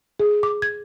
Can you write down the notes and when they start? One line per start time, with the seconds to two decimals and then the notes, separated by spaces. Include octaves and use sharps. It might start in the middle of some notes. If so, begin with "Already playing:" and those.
0.20 G#4
0.43 D6
0.62 G#6